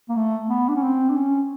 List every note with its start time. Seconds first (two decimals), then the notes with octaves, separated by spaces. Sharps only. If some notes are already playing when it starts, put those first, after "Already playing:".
0.09 A#3
0.16 A3
0.49 B3
0.68 D4
0.76 C#4
0.83 C4
1.09 D4
1.16 C#4